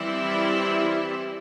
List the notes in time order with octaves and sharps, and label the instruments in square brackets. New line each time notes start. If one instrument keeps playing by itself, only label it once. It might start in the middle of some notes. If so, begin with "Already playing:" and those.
Already playing: [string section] E3 G3 C4 E4